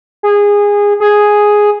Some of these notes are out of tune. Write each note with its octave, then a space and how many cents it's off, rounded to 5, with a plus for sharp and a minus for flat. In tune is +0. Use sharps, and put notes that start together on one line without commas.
G#4 -20
G#4 +0